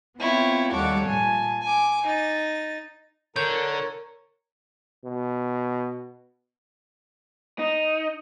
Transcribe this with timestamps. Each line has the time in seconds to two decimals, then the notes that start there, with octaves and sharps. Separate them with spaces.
0.18 B3 C4 E4 F4 C#5 G5
0.72 D#2 G3 A4 C#5 F#5 D6
1.06 A#2 G#5 A5
1.62 G#5 D6
2.04 D#4 A6
3.36 D3 A#4 C#5 G6
5.05 B2
7.59 D#4